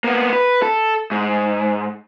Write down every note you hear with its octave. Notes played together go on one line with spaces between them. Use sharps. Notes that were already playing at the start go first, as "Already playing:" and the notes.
A#3 B3
B4
A4
G#2